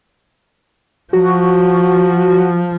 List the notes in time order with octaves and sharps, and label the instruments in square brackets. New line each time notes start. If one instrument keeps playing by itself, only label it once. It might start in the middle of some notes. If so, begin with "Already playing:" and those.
[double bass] F3 [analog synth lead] F#4